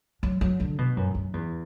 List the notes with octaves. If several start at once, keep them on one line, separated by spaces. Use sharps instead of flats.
F#3
F#3
D3
B2
F#2
F#2
E2